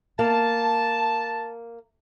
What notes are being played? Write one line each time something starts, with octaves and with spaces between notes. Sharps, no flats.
A#3 A5